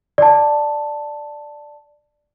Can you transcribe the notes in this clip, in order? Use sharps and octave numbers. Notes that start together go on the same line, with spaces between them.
D5 A5